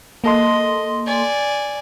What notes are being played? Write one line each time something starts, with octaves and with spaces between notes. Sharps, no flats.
A#3 A4 D#5 C6
D5 G#5